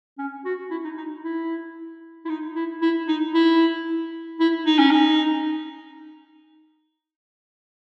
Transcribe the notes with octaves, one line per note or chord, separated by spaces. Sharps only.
C#4
F#4
E4
D#4
D#4
E4
E4
D#4
E4
E4
D#4
E4
E4
D#4
C#4
D#4